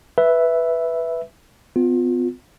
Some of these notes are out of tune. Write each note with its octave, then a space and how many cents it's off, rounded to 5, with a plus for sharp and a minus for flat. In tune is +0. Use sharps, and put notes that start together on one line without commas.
B4 +0 E5 +0
B3 +45 F4 +20